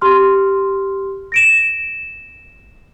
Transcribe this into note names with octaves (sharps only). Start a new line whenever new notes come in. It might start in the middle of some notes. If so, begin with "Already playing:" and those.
G4 C6 F6
A#6 D7 E7